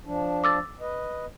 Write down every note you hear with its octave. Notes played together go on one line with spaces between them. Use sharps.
F3 D4
D6 E6 A6
B4 D#5